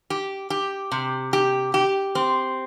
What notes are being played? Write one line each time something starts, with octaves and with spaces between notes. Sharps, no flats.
G4
G4
C3
G4
G4
C4